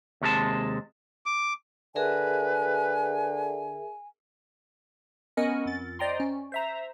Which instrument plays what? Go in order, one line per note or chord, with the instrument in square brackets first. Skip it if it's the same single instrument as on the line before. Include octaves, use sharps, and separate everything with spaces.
[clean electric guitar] D#2 C3 G#3 A5
[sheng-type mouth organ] D6
[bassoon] D3 [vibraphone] G#4 A#4 E5 [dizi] B4 [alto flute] G#5
[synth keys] B3 C#4 A#4 D#5 F#5 G#5
F2 A6
C5 D5 D#5 G5 A#5 C6
C#4
C5 E5 A#5